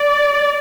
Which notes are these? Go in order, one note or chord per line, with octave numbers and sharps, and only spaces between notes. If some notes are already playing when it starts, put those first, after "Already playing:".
Already playing: D5